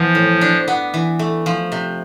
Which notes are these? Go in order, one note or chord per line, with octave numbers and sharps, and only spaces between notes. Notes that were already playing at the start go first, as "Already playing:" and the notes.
Already playing: E3 F3 B3
A2
D4
B3
E3
A3
F3
C3